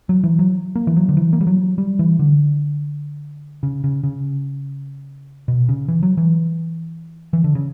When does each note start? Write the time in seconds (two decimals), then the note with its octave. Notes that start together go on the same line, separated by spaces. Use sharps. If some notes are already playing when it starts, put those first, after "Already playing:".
0.09 F#3
0.24 E3
0.39 F#3
0.75 A#3
0.87 E3
0.96 F#3
1.09 D3
1.17 E3
1.33 A#3
1.41 G3
1.47 F#3
1.78 G3
1.99 E3
2.19 D3
3.63 C#3
3.84 C#3
4.04 C#3
5.48 B2
5.69 C#3
5.88 E3
6.03 F#3
6.17 E3
7.33 E3
7.44 D3
7.55 C#3